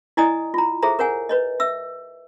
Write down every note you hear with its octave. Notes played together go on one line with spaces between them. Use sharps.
E4 D5 D#5 G#5 A#5 D#6
F4 A#5
G#4 A4 C5 E5 A#5
A#4 C#5 F#5 G#5
B4 C#5 D#5
E5 E6